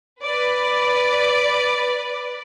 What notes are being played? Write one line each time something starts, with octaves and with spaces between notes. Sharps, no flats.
B4 D5